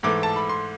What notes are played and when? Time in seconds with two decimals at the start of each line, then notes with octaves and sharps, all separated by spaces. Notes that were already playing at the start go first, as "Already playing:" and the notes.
0.03 G#2 E3 A3 D6
0.23 A5
0.36 B5
0.49 C6